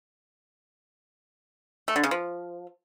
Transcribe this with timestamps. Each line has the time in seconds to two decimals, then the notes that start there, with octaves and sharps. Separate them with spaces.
1.88 A3
1.96 D3
2.04 C#3
2.11 F3